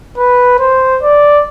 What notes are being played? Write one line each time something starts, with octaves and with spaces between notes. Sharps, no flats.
B4
C5
D5